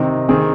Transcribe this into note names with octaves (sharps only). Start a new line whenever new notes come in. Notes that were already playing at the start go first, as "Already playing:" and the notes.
Already playing: C3 D#3 C4 D#4
D#3 C4 G#4